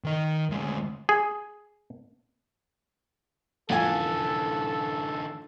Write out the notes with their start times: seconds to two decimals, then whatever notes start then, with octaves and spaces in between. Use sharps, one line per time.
0.04 D#3 D#5
0.50 D2 G#3
1.09 G#4
3.70 F2 D3 E3 A4 G#5